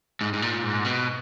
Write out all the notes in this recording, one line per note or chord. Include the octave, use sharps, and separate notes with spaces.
G#2
G#2
A#2
G#2
B2